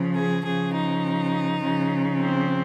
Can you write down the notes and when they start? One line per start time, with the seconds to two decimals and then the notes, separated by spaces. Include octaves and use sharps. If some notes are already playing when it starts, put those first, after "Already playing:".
Already playing: C#3 F3
0.15 G#4
0.44 C#3 F3 G#4
0.73 D#4
1.62 C#3 F3
2.20 C4